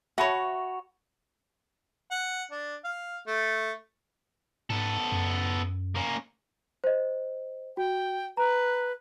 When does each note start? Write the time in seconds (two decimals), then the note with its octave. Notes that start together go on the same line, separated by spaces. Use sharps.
0.18 F#4 C#5 E5 A5 B5
2.11 F#5
2.51 D4
2.84 F5
3.27 A3
4.70 G#2 B3 A4
5.12 F#2
5.95 A#3 C#4
6.84 C5 D#5
7.77 F#4 G5
8.37 B4 A#5